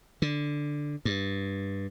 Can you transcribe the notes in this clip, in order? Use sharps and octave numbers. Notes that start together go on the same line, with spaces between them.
D3
G2